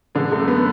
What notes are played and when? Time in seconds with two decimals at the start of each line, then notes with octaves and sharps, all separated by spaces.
0.15 D3 G#3
0.31 F#2 A3
0.48 B3